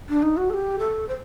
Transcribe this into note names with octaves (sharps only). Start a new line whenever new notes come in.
D4
D#4
F#4
A4
G4
A4
C5